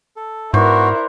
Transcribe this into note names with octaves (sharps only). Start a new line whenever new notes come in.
A4
G#2 B3 E4 F#4 A#4 C5 D5 F#5